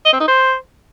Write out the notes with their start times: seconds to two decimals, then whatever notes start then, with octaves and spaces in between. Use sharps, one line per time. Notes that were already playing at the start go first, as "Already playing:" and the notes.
0.05 D#5
0.13 C4
0.20 D#4
0.28 C5